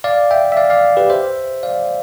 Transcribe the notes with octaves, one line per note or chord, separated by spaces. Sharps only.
D5 F5
E5 G5
E5
D5 F5
D5 F5
G4 B4
C5 E5
D5 F5